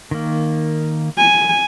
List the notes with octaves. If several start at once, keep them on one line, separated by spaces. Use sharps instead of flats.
D#3 A#3
G#5